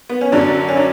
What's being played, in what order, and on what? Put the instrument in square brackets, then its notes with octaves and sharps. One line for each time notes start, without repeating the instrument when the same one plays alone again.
[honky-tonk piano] B3
C#4
F#2 D3 F#3 D4
C#4
D4